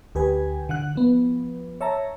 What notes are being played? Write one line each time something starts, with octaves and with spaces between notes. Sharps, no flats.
D2 G4 B4 G#5
D3 F#5 F#6
F3 B3
C#5 E5 A5 A#5